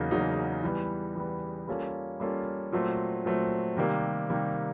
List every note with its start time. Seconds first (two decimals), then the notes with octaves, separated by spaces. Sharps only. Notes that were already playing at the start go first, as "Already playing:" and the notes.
Already playing: E2 C#3 F#3 A#3 D#4
0.11 E2 C#3 F#3 A#3 D#4
0.63 E3 G3 B3
1.16 E3 G3 B3
1.68 G3 A#3 C#4 F4 A4
2.20 G3 A#3 C#4 F4 A4
2.72 A#2 F#3 A3 C4
3.25 A#2 F#3 A3 C4
3.77 C3 D#3 G3 A#3
4.30 C3 D#3 G3 A#3